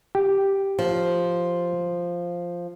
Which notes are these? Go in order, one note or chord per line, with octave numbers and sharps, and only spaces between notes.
G4
F3